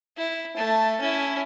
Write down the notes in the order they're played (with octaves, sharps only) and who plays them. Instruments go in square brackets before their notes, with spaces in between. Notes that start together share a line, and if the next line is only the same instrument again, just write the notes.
[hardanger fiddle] E4
A3 A5
C#4 E4